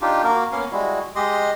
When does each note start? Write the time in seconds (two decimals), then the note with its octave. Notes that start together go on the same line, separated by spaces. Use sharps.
0.02 D4 D#4 F4 G4
0.24 A#3 F#4 A#4
0.52 A#3 B3 C#4 F5
0.72 G3 G#3 E4 F#4
1.15 G#3 G4 D#5 C6